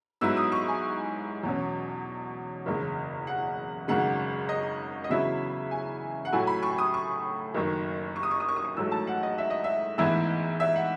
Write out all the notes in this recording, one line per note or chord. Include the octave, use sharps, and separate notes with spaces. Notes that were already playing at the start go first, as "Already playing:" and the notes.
G#2 F#3 B3 E4 E6
D#6
C#6
G#5
E2 B2 F#3 C#4
F#1 E2 C#3
F#5
G#1 F#2 C#3 G#3 F#5
D#5
D#5
E2 C#3 F#3 B3 E4 E5
G#5
F#5
A2 F#3 A3 E4 G#5
B5
C#6
D#6
C#6
F#1 F#2 D#3
C#6
D#6
C#6
D#6
C#6
D#6
C#6
A1 G#2 F#3 A3 E6
A5
F#5
D#5
E5
D#5
E5
A1 G#2 E3 B3 E4 E5
E5
F#5